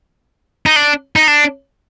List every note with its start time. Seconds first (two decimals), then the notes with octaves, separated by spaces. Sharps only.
0.66 D#4
0.76 D4
1.16 D#4
1.28 D4